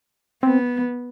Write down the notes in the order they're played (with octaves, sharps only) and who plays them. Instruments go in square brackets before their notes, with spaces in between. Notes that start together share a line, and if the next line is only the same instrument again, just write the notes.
[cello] B3 [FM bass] C4